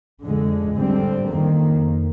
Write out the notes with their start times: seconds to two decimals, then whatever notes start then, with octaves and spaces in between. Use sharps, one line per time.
0.24 F2 D3 G#3
0.78 D3 G3 C4
1.31 F2 D#3 A#3